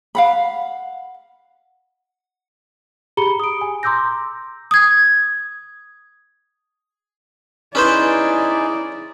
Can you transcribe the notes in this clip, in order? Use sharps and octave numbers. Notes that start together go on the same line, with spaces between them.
F5 F#5 B5
G4 G#4 A#5 B5 C#7 G7
D#6 D7
G#5
A#5 C6 D6 E6 G6 A#6
D#6 G#6
C#4 D#4 E4 G#4 B4 C5 D5